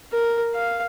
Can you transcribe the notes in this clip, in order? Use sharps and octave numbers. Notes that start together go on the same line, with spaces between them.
A#4
F5